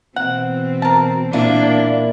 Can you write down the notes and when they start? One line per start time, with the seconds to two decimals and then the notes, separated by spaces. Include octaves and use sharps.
0.16 B2 E3 C4 F#5
0.82 A#4 A5
1.33 A#2 A#3 D4 E4